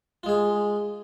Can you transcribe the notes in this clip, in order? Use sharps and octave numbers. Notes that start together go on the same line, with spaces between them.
G#3 F4 G#4